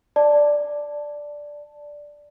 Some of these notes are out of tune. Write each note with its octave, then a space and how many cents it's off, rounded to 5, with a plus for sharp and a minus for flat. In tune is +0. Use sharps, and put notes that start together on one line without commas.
D5 +0 A5 +0